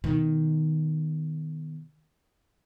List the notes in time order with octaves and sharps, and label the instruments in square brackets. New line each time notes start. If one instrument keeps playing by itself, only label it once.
[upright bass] B2 D#3